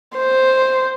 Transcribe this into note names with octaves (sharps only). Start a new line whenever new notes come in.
C5